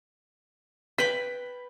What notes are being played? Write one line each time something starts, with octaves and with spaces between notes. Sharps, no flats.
B4 G5 B5 B6